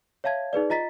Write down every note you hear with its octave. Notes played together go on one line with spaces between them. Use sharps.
C#5 E5 F5 A5 G#6
D#4 G#4 B4 D5
F4 D#5 A#5 A6 B6